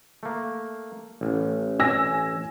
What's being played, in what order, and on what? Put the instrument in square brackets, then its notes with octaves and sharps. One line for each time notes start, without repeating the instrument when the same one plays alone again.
[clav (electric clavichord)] A3 A#3
A1
[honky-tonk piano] G#5 E6 A#6